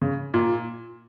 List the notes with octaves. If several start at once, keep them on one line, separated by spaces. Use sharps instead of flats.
C#3
A#2